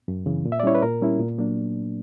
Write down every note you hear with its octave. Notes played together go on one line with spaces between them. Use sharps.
F#2
C#3 E3
A#2
E5
D5
G3 C#4 E4 C#5
B4
A#2 A#4
G3 C#4 E4
A#2
F#3 A#3 D4